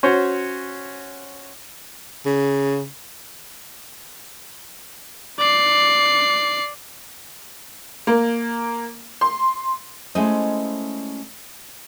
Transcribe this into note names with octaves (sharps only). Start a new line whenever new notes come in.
C#4 F#4 C5 C#5
C#3
D5 C7
A#3
C6
G#3 A3 C#4 E4 C5 D#5